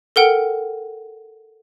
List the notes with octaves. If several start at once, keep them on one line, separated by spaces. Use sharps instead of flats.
A4 A#4 F#5 G5